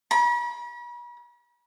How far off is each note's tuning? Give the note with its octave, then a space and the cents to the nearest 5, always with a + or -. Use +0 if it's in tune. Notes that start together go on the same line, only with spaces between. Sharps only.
B5 -45